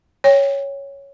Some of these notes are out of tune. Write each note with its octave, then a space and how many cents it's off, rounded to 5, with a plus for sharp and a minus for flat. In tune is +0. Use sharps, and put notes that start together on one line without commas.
C#5 +0 G5 +25